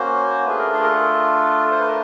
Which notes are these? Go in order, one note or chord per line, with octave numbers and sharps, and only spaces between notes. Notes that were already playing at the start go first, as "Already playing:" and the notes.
Already playing: A#3 C#4 F#4 C5
A3 D4 F4 G#4 B4
A#4
G#4
A#4
A4
C5
B4
A#4